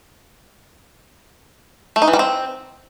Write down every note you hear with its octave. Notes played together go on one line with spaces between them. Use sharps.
A3
D#4
E3
G3
C4